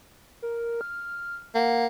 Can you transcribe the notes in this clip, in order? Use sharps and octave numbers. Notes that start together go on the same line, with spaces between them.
A#4
F6
A#3 F#5